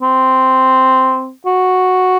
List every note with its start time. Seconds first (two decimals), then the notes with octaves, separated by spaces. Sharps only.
0.02 C4
1.46 F#4